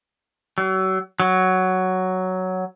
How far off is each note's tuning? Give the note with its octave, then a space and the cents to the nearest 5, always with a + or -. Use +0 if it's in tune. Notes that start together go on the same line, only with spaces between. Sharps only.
F#3 +35
F#3 +5